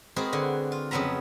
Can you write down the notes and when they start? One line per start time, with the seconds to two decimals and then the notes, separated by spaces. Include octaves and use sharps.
0.16 G#3 C4 F#4 G#4 A#4 B4
0.33 D3
0.72 F4
0.91 F2 C#3 F#3 B3 E5 A#5